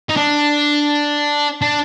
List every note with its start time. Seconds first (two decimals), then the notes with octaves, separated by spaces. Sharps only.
0.09 D#4
0.17 D4
1.62 D4